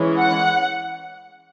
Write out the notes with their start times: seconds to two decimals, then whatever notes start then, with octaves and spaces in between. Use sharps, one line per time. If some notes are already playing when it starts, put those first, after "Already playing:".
Already playing: E3 G#3 C#4
0.19 F#5